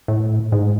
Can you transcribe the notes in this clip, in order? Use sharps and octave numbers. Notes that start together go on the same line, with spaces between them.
A2
G#2